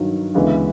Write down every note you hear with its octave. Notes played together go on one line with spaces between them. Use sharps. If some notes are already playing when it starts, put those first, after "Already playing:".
Already playing: G2 D#3 F#3
D2 C#3 E3 G#3 B3